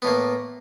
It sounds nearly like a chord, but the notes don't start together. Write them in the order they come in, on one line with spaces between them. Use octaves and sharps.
B3 A2 A#3